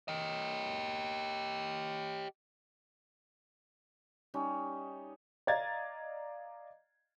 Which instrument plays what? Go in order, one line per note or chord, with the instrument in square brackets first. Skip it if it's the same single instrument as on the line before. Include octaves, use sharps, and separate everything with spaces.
[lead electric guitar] G4 D#5
[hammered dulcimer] G3 C#4 D#4
[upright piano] D5 D#5 F5 A#5 G#6 A6